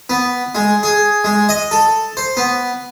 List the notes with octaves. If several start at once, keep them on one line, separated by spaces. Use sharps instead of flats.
B3
G#3
G#4
G#3
D#5
A4
C5
B3